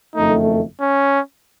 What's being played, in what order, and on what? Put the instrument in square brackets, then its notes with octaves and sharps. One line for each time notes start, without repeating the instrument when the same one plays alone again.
[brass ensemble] F#1 F2 D#3 A3 [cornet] D#4
[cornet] C#4